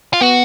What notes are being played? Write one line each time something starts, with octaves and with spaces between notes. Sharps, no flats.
F4
B3 F#4